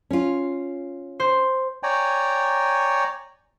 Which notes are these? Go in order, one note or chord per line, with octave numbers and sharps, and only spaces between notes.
C#4 F4
C5
C#5 D5 G5 G#5 A#5